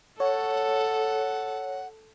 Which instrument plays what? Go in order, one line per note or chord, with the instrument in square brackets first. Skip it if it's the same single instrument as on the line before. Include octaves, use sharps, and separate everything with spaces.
[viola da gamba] A4 [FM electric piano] C#5 [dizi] F#5